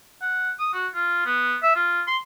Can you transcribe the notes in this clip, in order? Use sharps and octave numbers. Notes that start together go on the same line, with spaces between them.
F#5
D#6
F#4
F4
B3
E5
F4
C6